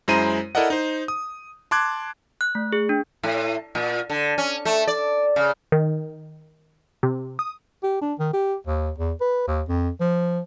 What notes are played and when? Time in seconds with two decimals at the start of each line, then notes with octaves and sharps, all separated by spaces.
0.08 F#2 G#3 E4 C5 A#5 D#7
0.55 E4 A4 A#4 D5 D#5 F#5
0.70 D#4 C5
1.08 D#6
1.71 A5 C6 D6 F#6 G#6
2.41 F#6
2.55 A3
2.73 G#4
2.89 D4
3.23 A2
3.75 A#2
4.10 D3
4.38 C#4
4.65 A3
4.88 D5
5.36 C#3
5.72 D#3
7.03 C3
7.39 D#6
7.83 G4
8.01 D4
8.19 D#3
8.33 G4
8.67 D#2
8.99 E2
9.21 B4
9.47 D#2
9.68 F2
10.01 F3